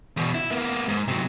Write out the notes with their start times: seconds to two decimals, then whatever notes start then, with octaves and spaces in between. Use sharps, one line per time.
0.17 E2 B2
0.34 E4
0.51 A#3 B3
0.88 G#2
1.08 C3 F#3